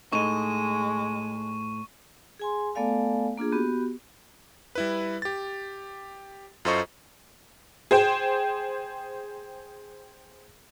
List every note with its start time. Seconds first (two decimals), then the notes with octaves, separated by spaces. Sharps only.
0.12 A2 G#3 D#4 C#6 D#7
2.39 G#4 G#5 C6
2.75 A3 B3 A4 D5 F5 G#5
3.38 A#3 D4 F4 G#4
3.52 B3 F#4 G4
4.75 G3 E4 B4
5.22 G4 A6
6.65 F#2 F4 A4 C5 D#5 C#6
7.91 G#4 C5 G5